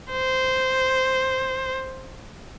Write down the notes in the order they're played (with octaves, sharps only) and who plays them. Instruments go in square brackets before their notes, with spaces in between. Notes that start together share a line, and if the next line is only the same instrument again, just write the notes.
[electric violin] C5